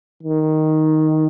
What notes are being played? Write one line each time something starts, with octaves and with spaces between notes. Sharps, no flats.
D#3